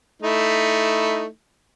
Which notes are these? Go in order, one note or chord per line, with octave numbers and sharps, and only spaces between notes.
A3 D#4 E4